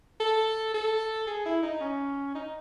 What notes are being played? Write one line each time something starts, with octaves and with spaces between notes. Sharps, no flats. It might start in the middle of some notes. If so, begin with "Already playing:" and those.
A4
A4
G#4
E4
D#4
C#4
D#4